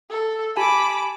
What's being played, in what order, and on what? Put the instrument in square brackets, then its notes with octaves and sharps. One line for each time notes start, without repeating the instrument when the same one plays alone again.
[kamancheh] A4
[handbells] G4 G#5 A5 [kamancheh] B5 D6